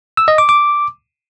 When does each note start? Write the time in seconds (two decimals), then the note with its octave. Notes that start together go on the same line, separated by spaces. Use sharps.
0.17 E6
0.28 D#5
0.38 D6
0.49 D6